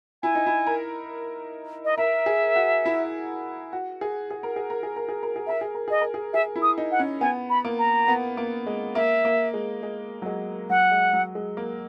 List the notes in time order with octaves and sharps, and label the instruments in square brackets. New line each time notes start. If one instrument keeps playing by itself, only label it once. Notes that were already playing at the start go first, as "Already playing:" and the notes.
[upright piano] E4 [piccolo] G#5
[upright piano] D#4
E4
A#4
[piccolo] D#5
[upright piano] A#4 [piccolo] E5
[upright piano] G#4
F#4
E4
F#4
G#4
G#4
A#4
G#4
A#4
G#4
A#4
G#4
A#4
G#4
[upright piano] A#4 [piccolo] E5
[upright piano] G#4
A#4
[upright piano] G#4 [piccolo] D#5
[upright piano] A#4
G#4
[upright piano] G#4 [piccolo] E5
[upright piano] E4
[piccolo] D#6
[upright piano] D#4
[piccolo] F#5
[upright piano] C#4
[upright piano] B3 [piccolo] G#5
[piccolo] B5
[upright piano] A#3
[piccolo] A#5
[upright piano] B3
A#3
G#3
[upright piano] A#3 [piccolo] E5
[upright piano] A#3
G#3
G#3
F#3
G#3
[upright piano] F#3 [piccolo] F#5
[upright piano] G#3
F#3
G#3
A#3